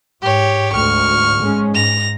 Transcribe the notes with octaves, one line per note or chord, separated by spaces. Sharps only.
G#2 G4 C#5
D2 G#2 C#6 F6
G#2 G#3 C#4
G#2 A#6 F7